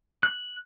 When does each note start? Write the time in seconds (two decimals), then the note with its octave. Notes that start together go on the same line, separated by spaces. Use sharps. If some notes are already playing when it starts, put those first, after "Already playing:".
0.23 F#6